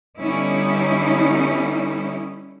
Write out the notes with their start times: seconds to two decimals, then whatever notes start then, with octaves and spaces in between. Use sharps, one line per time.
0.19 D3 G3 B3 C#4 D#4 E4